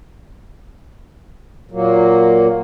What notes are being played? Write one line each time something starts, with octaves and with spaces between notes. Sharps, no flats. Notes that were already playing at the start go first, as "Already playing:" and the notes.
A#2 F#3 A#3